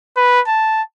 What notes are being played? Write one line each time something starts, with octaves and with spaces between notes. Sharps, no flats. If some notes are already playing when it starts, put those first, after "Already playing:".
B4
A5